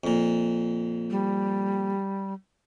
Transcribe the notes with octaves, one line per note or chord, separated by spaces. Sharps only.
F2 A#2
G3